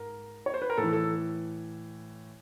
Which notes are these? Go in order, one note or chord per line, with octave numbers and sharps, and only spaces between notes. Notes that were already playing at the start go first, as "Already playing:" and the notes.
Already playing: G#2 A#4
C#5
C5
B4
A#4
A2 E3 A4
A4